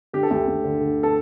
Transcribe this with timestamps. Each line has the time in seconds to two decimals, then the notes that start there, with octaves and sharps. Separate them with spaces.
0.13 D3 G4
0.23 A4
0.31 D2 G4
0.47 D2
0.64 D3
0.81 D3
1.03 A4